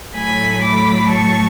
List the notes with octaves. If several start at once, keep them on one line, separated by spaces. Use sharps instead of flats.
A2 F#3 A3 G#5 B5
B5 D6
A5 C#6